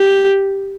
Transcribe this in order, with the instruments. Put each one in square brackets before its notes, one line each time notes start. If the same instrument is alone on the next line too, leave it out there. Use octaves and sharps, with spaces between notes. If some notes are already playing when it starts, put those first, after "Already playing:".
Already playing: [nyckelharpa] G4